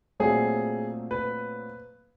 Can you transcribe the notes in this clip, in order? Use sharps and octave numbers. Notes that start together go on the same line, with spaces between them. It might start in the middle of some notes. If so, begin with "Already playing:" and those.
A#2 F#3 A3 C4 G#4
B4